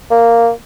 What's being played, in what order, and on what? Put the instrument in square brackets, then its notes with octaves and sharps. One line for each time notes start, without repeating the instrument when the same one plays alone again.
[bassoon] A#3